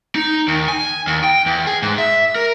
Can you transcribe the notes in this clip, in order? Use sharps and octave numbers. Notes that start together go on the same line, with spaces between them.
D#4
D#2
G#5
D#2
G5
E2
G#4
G#2
E5
A#4